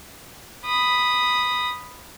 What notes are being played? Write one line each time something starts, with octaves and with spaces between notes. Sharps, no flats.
B5 D#6